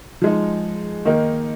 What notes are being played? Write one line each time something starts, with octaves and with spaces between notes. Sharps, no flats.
F3 G#3 D#4
D#3 A#3 D#4